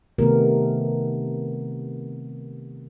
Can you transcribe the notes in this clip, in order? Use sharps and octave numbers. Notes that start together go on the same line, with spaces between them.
C3 D#3 A3 B3 G4 A#4